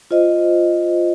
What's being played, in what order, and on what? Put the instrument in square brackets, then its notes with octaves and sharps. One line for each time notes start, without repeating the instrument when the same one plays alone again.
[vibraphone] F4 C5 D#5